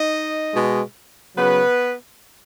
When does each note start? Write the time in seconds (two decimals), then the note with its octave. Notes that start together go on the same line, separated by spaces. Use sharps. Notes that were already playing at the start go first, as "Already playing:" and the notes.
Already playing: D#4 D#5
0.54 B2 G#3
1.36 C#3 F#3 B3 B4